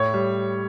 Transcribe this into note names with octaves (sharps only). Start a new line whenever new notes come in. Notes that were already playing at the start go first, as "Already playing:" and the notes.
Already playing: A2 C#5
G3